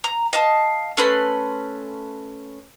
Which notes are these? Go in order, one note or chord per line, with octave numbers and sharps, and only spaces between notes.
A#5
D#5 F5 A5
A3 C#4 B4 C6